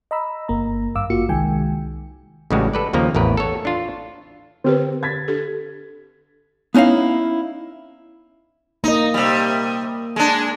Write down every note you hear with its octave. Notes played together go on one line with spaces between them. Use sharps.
D#5 A#5 B5 E6
G1 A#3 A#5
G#1 G2 F5 D6 E6
G#1 A#3 F4 F#4 C#7
C2 D#3 G#3 G5 G#5
A1 A2 C#3 G3 G#3 F#4
A4 B4 D5
D#2 C#3 F3 A#3 A#5
A1 E2 A#4 B4
A4 C#5
D4 F4
D3 C4 G4 A#4 B4
G#6 A6 B6
D4 G4 A4
B3 C#4 D#4 E4 F5
A#3 D#4 D#5
C3 G3
G#3 D4